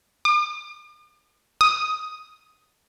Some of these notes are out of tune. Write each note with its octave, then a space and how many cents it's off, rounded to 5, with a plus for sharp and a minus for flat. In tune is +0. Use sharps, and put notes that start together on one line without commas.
D#6 -45
D#6 +10